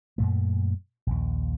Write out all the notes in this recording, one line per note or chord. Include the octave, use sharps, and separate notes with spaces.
F#2 A#2 A3
A#1 D#2